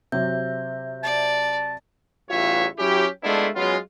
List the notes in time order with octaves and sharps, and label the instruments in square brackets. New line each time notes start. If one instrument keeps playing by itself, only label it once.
[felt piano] C3 F#3 G4 [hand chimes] C5 E5 G6
[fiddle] D5 [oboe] A5
[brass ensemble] A1 E2 G2 F4 C#5 E5
F#3 C#4 E4 G4
G#3 A3 B3 D4 E4 F4
F#3 G#3 B3 C#4 F4